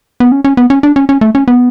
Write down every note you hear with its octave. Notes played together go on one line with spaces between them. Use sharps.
B3
C#4
C#4
B3
C#4
D4
C#4
C#4
A3
C#4
B3